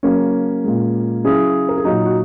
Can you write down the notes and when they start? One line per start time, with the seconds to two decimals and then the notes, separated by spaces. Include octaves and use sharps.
0.03 C#3 F#3 A#3 C#4
0.64 A#2 G#3
1.24 C#3 F#3 E4 G#4
1.69 A#4
1.77 G#4
1.85 A#2 F#3 D#4 F#4
2.06 F#4